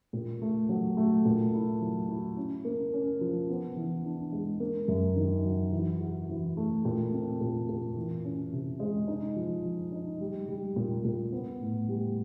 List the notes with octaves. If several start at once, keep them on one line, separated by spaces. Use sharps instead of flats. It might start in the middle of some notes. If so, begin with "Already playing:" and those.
A#2
A3
F#3
A3
A#2
E4
F#3
E4
C#4
A#3
C#4
F3
B3
E3
D4
G#3
A#3
F#2
D#3
F#3
E3
F#4
E3
A3
A#2
C4
A#2
A#2
E3
C#4
C3
G#3
D#4
F3
F3
D#4
G3
G3
A#2
A#2
B3
A2
G3